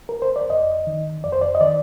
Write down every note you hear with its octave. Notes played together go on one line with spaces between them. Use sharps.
A#4
C5
D5
F2 D#5
D#3
F2 D5
C5
D5
D#5
D#3 D5